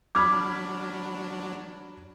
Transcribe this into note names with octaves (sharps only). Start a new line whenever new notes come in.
F#3 D4 B5 D6 F6 G#6